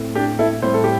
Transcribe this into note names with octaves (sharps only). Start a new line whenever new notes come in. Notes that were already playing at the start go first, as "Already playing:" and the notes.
Already playing: A2 A3 C4
D4 G4
E4 A4
A2 G3 C4 C5
A4
G4